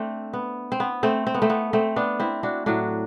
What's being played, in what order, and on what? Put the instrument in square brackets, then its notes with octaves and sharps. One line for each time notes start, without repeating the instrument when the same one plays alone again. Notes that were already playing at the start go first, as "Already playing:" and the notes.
Already playing: [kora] A3 C4 D4
B3
C4
B3
A3 C4
C4
B3
A3 C4
B3
A3 C4
B3 D4
C4 E4
D4 F#4
A2 F#3 D4 F#4